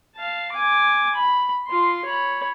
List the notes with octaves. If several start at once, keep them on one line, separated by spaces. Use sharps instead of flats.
F5 A5
G#5 D6
B5
F4 C6
C#5 B5